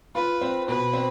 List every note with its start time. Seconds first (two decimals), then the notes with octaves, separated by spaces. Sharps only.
0.15 F4 B4
0.41 C4
0.68 B2 B4
0.93 C4